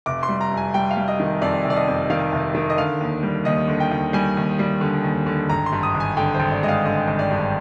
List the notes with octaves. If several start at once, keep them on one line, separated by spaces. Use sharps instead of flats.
F1 D6
C6
G3
A#5
F2
G#5
G3 G5
F5
G3
D#5
D#3
F2 D5
F1
D5
D#5
F2
D#3 F5
F1
D#3
D#5
D3 F5
D#2
G3
D#2 D#5
D3
G5
D#2
G3 G#5
D#2
G3
D3
D#2
D3
G#1 A#5
C6
G2
D#6
G#1
G#5
D3 G5
C5
G#1
D5
G#3 D#5
F5
D3 D#5
G#1
D5
G2